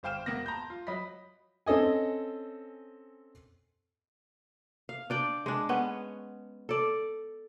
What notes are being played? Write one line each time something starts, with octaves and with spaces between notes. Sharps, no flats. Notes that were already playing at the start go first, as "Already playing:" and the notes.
G1 C5 F5 G5 F6 E7
E1 A#3 B3 A#6
A5 A#5 C6 G6
F4
F#3 D#5 B5 B6
C4 C#4 A4 D#5 G#5
F5
D4 D5 G5
G#3 D4
B3 C#4
A4 D5